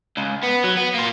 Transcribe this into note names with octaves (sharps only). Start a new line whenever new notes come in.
C#2
B3
F#3
B3
A#3 F4